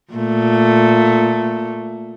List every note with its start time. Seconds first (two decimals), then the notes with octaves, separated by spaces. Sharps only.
0.14 A#2 A3